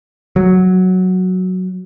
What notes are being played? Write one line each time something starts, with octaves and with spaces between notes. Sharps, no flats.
F#3